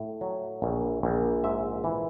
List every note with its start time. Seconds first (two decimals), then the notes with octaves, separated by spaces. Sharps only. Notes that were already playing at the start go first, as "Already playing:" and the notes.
Already playing: A2
0.21 F#3
0.62 A#1
1.03 A#1
1.44 G#2 E5
1.84 E3